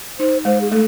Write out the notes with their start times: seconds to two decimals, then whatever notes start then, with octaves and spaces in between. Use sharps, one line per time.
0.19 D#4 C5
0.45 G#3 C5
0.61 G#4
0.72 A3 A4